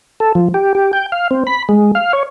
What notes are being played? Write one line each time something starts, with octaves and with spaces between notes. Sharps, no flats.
A4
F3
G4
G4
G5
F5
C4
B5
G#3
F5
C#5